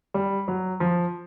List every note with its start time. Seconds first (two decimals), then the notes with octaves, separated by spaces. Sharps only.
0.14 G3
0.48 F#3
0.80 F3